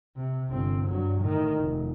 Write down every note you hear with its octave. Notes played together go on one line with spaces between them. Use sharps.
C3
G1 C4
G2 F#3
A2 D#3
F1